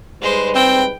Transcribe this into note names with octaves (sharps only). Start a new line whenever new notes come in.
G#2 G3 G#3 B4 C5
C4 G5